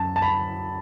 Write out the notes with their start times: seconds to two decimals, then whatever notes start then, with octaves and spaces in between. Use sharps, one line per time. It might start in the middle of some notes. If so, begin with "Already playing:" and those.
Already playing: F#2 A5
0.16 A5
0.22 B5